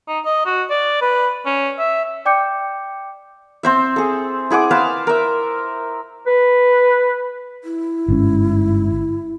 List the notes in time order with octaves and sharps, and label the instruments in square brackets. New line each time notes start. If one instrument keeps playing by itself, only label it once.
[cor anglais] D#4
D#5
F#4
D5
B4
C#4
E5
[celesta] D5 G5 D6 G6 C#7
[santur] C4 C5 E5
G#4 A4
E4 G#4 F#5 D6
B4 C5 F5 A5
A#4 E5
[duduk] B4
[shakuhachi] E4
[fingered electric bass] G1 G#2 C#4